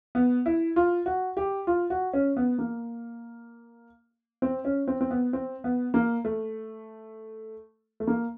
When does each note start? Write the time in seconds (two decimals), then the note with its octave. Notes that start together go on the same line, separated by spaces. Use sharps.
0.15 B3
0.46 E4
0.76 F4
1.06 F#4
1.37 G4
1.67 F4
1.90 F#4
2.13 C#4
2.37 B3
2.58 A#3
4.42 C4
4.65 C#4
4.88 C4
5.01 C4
5.11 B3
5.33 C4
5.64 B3
5.94 A#3
6.25 A3
8.00 A3
8.07 A#3